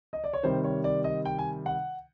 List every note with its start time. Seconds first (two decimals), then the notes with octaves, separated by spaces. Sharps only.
0.13 D#5
0.24 D5
0.33 C#5
0.43 C3 D#3 G3 C5
0.64 C#5
0.84 D5
1.04 D#5
1.25 G5
1.39 G#5
1.66 F#5